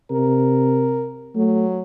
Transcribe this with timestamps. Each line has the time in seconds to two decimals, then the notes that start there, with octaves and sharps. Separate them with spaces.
0.11 C3 A#4
1.36 F#3 A3